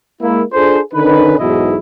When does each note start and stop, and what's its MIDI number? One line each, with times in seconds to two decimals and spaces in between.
0.22 0.42 56
0.22 0.42 58
0.22 0.42 64
0.53 0.79 62
0.53 0.79 65
0.53 0.79 68
0.53 0.79 69
0.53 0.79 72
0.94 1.38 50
0.94 1.38 51
0.94 1.38 61
0.94 1.38 63
0.94 1.38 71
1.39 1.76 35
1.39 1.76 40
1.39 1.76 44
1.39 1.76 47
1.39 1.76 64
1.39 1.76 75